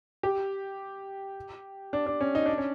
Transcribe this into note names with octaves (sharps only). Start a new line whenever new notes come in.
G4
D4
D4
C#4
D#4
D4
C#4